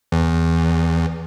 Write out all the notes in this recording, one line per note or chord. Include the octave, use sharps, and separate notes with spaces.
E2